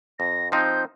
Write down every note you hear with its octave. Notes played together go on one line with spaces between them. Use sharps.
F2 A#6
F3 C4 D#4 G6